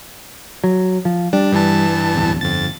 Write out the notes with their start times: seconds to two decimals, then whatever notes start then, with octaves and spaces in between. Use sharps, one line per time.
0.64 F#3
1.05 F3
1.33 G3 D4
1.52 G2 E3 A5
2.15 D1 E2
2.41 G1 F2 A6